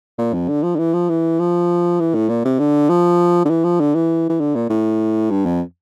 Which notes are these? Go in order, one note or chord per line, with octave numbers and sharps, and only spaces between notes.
A#2
F2
D3
F3
D3
E3
F3
E3
F3
E3
A2
A#2
C3
D3
F3
D3
E3
F3
D3
E3
E3
D3
A#2
A2
G2
F2